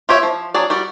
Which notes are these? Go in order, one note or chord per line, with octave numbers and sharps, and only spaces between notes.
F4 G4 C#5 E5
F3
F#3 D4 G#4 D5
G3 F#4 D5